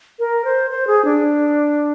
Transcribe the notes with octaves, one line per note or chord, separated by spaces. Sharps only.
A#4
C5
C5
G#4
D4